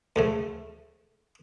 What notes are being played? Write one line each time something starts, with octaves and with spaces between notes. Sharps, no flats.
D2 C#3 A3